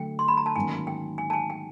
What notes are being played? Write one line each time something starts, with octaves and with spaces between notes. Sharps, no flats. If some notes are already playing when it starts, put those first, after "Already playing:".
Already playing: D3 F#3 A3 G5
C6
B5
A#5
A5
G#2 D#3 F#3 A#3 C#4 G#5
G5
G#5
A5
G#5
G5